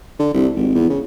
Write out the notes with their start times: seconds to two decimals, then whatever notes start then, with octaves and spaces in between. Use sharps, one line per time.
0.19 D3
0.34 C2
0.56 G#1
0.75 E2
0.89 C#3